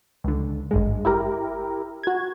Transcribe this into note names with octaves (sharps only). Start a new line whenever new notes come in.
C#2 D3
G#1 G2 G#3
E4 G4 A#4
F#4 G#6